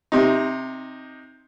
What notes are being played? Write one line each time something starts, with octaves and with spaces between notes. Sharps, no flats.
C3 D#4